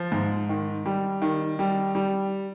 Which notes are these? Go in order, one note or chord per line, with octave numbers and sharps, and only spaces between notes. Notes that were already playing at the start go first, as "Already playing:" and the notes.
Already playing: F3
G#2
D#3
G3
D#3
G3
G3